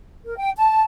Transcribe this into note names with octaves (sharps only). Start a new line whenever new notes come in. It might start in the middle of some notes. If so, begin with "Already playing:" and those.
A#4
G5
A5